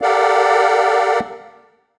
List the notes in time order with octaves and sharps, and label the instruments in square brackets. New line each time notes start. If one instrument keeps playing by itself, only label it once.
[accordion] G4 A4 A#4 D5 F5 F#5